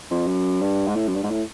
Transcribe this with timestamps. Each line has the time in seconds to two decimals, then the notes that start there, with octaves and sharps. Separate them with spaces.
0.10 F2
0.27 F#2
0.61 G2
0.87 G#2
0.96 A2
1.08 F#2
1.15 G2
1.23 G#2
1.30 A2